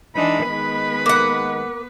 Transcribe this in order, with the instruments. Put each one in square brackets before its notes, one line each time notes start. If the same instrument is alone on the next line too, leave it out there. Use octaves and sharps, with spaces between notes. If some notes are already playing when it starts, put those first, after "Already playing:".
[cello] E3 D4 [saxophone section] G#3 D#4 [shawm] B5
[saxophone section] D#3 G#3 [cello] B3 B4
[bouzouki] A#3 F#5